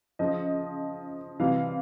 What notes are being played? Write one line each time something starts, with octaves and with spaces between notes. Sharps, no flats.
C#3 F3 D#5
C3 E3 G3 F5